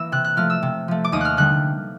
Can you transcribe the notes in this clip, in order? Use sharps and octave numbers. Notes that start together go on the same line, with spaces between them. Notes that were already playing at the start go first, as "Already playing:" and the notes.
Already playing: E3 A#3 E6
C3 F#6
F#6
F3 A3 F6
E6
C3
F3 A3
D6
D#2 D#6
F6 F#6
D3 G3 F#6